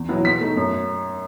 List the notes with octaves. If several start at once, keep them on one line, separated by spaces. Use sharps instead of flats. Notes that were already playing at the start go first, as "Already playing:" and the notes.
Already playing: E2
B2 F#3 B3 E4
B2 B6
A3 D#4
F#2